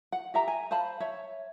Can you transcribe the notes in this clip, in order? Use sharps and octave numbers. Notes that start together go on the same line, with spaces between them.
F#5
G4 E5 A#5
G#5
C5 F5 A5 B5
C#5 E5